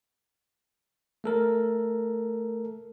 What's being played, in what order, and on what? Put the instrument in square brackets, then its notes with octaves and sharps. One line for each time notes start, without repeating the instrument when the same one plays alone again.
[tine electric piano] A3 A4 A#4